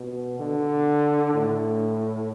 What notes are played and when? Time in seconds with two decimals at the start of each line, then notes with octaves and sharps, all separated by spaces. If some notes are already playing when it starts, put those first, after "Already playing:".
Already playing: B2
0.40 D3
1.34 A2